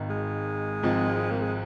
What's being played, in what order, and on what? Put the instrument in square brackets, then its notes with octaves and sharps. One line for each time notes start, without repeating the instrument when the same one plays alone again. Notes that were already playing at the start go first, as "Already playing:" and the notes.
Already playing: [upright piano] G#1 G#2 D#3
[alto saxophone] G#3
[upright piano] G#1 G#2 F3 C4
[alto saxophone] A#3
G#3